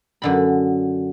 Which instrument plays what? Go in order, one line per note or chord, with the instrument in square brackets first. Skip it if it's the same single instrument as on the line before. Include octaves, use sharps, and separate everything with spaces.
[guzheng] F#2 D3 B5